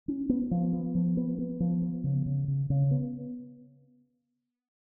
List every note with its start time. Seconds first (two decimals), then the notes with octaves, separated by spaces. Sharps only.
0.08 C#4
0.29 B3
0.51 F3
0.73 B3
0.95 F3
1.17 B3
1.39 B3
1.60 F3
1.82 B3
2.04 C#3
2.26 C#3
2.48 C#3
2.70 C#3
2.91 B3